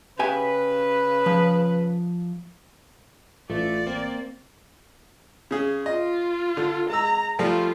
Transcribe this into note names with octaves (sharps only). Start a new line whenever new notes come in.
C#3 G4 B4 E5 G#5
F3
A1 A3 F4 D5
A#3 C4
C#3 G#4
F4 D#5
D3
G#3 A#5 E6
F3 G3 A3 F4